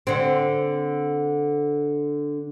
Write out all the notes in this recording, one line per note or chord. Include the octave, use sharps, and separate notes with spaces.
D3 C4